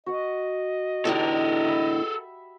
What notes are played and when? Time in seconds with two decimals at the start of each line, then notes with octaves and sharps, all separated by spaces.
0.06 F#4 D#5 F#5
1.05 E2 A2 D3 D#4 G4 A4 A#4 D#6
1.66 E5 F#5 B5